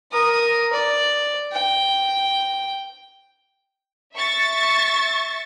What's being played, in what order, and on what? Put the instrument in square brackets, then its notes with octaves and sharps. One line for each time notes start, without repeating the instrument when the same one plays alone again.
[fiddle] A#4 D#6
D5
G5
[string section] E5 C#6 A6